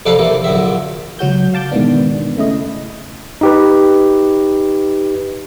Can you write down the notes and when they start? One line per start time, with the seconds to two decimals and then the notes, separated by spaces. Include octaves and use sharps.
0.06 F2 C3 D4 A4 B4 F5
0.19 C2 C3 E3 A#3
0.44 A#1 F#2 D3 E5
1.19 C#2 F#3 F#4 G6
1.54 F5 A5 D6 G6
1.72 G#2 B2 D#3 E3 B3 D4
2.37 C#3 A3 E4 D#5
3.41 D#4 G4 B4